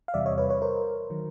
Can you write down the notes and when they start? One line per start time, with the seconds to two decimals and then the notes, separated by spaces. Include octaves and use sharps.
0.08 F5
0.14 E2 C3 E3 G3 D5 E5
0.26 C#5 D#5
0.38 B4 C#5
0.50 B4 C#5
0.62 A#4 C5
1.10 D#3 F#3